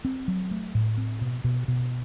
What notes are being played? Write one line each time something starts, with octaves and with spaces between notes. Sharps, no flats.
C4
F#3
A3
A2
C4
B2
B2
B2